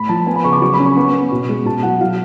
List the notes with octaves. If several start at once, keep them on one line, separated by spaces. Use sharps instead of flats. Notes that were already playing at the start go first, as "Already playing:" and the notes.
Already playing: A2 B5
F3 A5
B3 G#5
B5
C#3 C#6
D6
F#3 C#6
B5
C#4
C#6
B3 C#6
B3
B2
G#3
B2 A5
F#3 F#5
F#3 F5